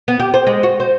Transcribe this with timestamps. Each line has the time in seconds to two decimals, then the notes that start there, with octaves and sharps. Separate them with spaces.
0.08 B3
0.20 G4
0.34 C5
0.47 G#3
0.63 F#4
0.80 C5